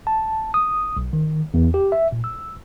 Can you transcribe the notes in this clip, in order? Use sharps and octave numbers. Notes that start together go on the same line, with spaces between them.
A5
D#6
B1
D#3
E2
G4
E5
A#2
E6